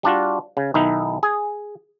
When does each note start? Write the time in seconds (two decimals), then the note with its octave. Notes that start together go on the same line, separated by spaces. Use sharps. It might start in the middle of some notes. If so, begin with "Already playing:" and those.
0.03 G3 D4 F4 F#4
0.57 C#3
0.74 B1 D#3 D#4 E4
1.23 G#4